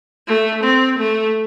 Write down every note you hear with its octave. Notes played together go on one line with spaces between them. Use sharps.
A3
C4
A3